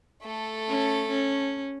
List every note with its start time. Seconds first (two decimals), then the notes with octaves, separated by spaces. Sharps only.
0.22 A3 A4
0.68 C#4
1.09 C#4